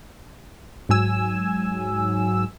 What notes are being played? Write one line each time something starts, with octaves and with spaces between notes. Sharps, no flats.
G#2 F#3 G#5 E6